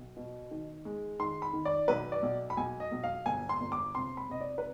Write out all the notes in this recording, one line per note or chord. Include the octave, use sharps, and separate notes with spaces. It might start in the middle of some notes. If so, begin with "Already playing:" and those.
Already playing: B1
B2
D#3
G#3
D#3 C6
B5
D#3
D5
B1 B4
D5
B1
B5
B1 G#5
D#5
B1
F5
G1 G#5
C6
G1
D6
C3 C6
B5
C3 D#5
D5
B4